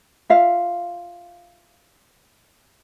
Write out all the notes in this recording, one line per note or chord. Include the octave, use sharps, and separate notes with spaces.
F4 E5 F5